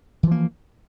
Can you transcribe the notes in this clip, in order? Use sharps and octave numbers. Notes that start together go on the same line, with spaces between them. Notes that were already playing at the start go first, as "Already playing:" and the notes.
E3 F3 A#3